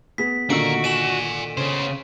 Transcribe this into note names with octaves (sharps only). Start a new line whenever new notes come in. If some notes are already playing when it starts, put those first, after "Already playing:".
B3 G#4 B6
A#2 D3 D#3 A#3 F#4 E6 D7
D5 G#5 D#7 E7 F#7
C#3 B3 C#4 C5